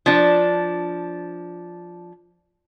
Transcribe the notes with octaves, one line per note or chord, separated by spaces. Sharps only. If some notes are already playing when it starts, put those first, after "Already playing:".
F3 D4